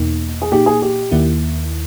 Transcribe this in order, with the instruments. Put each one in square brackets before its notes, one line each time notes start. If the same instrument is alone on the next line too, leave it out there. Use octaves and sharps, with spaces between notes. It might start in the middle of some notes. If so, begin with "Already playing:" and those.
Already playing: [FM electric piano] E2 B2 A#3 D#4
[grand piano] G#4
[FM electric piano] A#2 A#3 D#4 [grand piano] G4
[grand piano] G#4
G4
[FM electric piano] D#2 D#3 A#3 E4